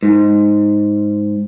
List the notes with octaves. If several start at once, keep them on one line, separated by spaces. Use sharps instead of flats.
G#2